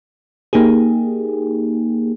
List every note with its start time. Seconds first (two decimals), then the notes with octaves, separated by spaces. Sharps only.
0.53 A#3 D#4 G4 G#4